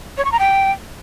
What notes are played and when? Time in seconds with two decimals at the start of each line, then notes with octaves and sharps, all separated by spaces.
0.18 C#5
0.25 C#6
0.32 A#5
0.39 G5